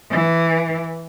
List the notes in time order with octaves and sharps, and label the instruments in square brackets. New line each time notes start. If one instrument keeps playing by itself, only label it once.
[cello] E3